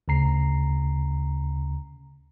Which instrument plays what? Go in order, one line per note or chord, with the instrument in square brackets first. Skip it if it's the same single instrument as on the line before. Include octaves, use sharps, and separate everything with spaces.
[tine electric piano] D2 C#3 A#5 C7